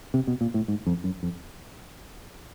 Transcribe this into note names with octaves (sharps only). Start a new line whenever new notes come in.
C3
B2
A#2
A2
G#2
F2
F#2
F2